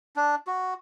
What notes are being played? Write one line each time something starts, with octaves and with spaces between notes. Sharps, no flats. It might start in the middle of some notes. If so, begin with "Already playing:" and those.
D4
F#4